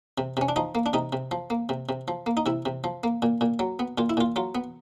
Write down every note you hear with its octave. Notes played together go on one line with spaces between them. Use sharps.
C3
C3 C#4
D4
F3 D#4
A#3
D4
C3 D#4
C3
F3
A#3
C3
C3
F3
A#3
D#4
C3 E4
C3
F3
A#3
A#2
A#2
F#3
B3
A#2 F4
E4
A#2 F4
F#3 F4
B3